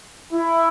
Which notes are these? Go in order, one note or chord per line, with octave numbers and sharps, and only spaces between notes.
E4